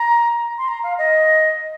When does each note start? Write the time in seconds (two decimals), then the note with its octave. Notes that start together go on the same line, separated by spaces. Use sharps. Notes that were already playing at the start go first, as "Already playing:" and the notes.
Already playing: A#5
0.58 C6
0.68 A#5
0.83 F5
0.98 D#5